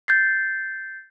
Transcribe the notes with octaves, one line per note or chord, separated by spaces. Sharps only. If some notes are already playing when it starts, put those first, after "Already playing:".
G6 A6 C7